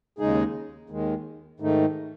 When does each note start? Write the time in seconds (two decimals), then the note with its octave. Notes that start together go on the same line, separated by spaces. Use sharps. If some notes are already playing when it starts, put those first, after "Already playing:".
0.19 D#2 C#3 G#3 D#4 G#4
0.90 D#2 D#3 G#3
1.60 G#2 D#3 A3 D#4